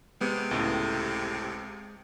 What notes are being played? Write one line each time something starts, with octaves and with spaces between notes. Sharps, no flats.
C3 G#3 B3
C#2 A2